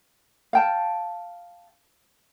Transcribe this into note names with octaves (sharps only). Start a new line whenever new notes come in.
F5 G5 A5